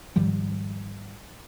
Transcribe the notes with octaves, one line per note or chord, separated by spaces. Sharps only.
G#2 D#3 F3 G3